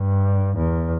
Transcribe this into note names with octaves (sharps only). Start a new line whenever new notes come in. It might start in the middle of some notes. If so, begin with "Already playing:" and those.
Already playing: G2
E2